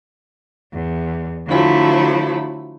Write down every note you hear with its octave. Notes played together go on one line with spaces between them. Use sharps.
E2
D3 F3 F#3 A3 E4